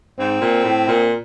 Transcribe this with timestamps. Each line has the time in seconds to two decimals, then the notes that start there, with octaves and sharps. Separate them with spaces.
0.19 G#2 C4
0.41 A#2
0.64 A2
0.88 A#2